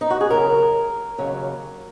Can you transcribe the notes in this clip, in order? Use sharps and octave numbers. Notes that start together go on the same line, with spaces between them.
D#4
F#4
G#4
D#2 C#3 F#3 A#4
D#2 C#3 F#3